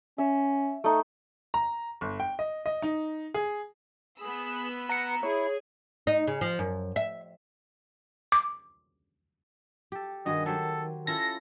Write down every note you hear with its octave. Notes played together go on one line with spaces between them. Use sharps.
C#4 E5
A3 D#4
A#5
G1
G5
D#5
D#5
D#4
G#4
B3 G#4 B5 E6
B4 F#5 A#5 C#7
E4 G#4 C#5
D#4
C#3
F3
F#2
E5
D6
G4 A4
G2 D#3 F#4 G#4 D#5
F#3 G4 A4 C5
C#4 E4 F4 A4 A#6